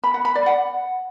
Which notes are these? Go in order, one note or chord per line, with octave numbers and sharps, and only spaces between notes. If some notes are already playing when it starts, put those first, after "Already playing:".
B5
F#5
B5
D5
F#5